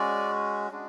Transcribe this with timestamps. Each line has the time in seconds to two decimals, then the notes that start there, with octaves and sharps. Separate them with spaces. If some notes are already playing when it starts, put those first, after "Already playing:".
Already playing: G#3 C#4 F#4 D5
0.71 G#3 D4 F#4